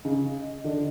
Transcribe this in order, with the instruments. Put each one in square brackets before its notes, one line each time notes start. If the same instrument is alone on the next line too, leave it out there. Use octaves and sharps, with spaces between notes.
[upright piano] C#3 [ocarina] D#5
[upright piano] D3